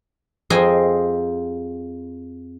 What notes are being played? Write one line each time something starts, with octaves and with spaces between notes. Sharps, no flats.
F2 G#4 C5 D#5 G5 G#5